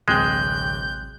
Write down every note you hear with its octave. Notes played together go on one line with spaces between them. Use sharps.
D1 A1 C3 G#3 G5 F#6 G6 G7